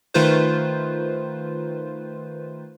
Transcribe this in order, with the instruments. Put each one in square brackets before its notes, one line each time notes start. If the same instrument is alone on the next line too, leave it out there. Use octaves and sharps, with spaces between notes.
[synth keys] D#3 A3 D#4 F4 B4 C5